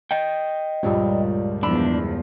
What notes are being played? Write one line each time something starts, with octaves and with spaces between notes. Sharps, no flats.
D#5 G5
C#2 G2 A#2 F3 G3
E2 F3 D4 B5 E6